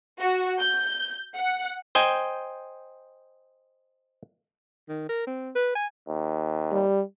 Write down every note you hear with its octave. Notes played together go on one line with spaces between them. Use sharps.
F#4
G6
F#5
C5 D#5 G5 G#5
D#3
A#4
C4
B4
G#5
D#2
G3